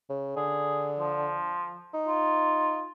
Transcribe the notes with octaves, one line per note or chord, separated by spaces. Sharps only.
C#3
D3 G#4
F3
D#4
F4